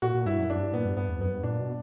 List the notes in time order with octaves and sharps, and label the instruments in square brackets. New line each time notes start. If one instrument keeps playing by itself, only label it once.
[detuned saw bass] A#2 [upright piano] F#4
[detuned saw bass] A#2
[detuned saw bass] G2 [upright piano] E4
[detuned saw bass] F#2
[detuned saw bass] F#2 [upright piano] D4
[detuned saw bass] G2
[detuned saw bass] A#2 [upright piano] B3
[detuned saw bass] G2
[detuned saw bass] G2 [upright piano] B3
[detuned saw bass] E2
[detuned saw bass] F#2 [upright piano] B3
[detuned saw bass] G2
[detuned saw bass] A#2 [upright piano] D4
[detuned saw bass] B2